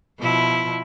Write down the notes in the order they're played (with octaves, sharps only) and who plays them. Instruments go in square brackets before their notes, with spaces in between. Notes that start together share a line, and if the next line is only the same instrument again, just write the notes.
[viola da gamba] B2 F3 E4